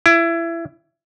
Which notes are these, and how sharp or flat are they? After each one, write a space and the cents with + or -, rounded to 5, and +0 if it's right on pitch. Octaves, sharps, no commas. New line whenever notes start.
E4 +25